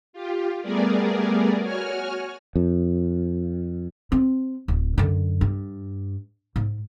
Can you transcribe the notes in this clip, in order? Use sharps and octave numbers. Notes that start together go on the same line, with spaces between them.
F4 G4
G3 A3 B3 G#4 A#4 D5
F#4 C#5 G#5 F6
F2
C4
D1
F#2 D3
G2
G#2